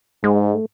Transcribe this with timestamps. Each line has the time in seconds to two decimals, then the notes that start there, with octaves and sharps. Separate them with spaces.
0.24 G#2 G#3
0.54 A3